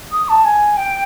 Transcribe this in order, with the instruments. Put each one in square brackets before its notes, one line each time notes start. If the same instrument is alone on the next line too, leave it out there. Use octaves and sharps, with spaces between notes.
[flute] D#6
A5
G#5
G5